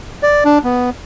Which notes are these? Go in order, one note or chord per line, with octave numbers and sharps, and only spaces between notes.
D5
D4
B3